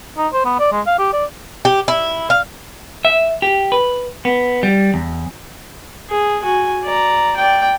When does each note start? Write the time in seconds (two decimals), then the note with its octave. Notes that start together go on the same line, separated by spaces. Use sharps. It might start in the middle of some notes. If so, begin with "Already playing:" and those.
0.18 D#4
0.33 C5
0.45 B3
0.59 D5
0.72 G#3
0.87 F5
0.99 G4
1.13 D5
1.65 G4
1.88 E4
2.30 F5
3.05 E5
3.42 G4
3.72 B4
4.25 B3
4.63 G3
4.94 E2
6.10 G#4
6.42 F#4 G#5
6.84 D5 A#5
7.36 D5 G5